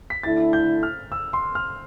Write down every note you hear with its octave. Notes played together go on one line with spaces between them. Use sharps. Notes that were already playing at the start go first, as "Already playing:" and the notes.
B6
D3 A3 E4 A6
G6
F6
E6
C6
F6